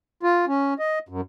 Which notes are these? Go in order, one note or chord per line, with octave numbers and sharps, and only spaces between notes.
F4
C#4
D#5
F#2